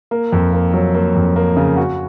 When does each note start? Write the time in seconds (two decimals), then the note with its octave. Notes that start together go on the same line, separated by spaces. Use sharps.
0.11 A#3
0.32 F2
0.53 A#3
0.74 F#3
0.94 A#3
1.15 F2
1.36 A#3
1.57 C#3
1.77 F#4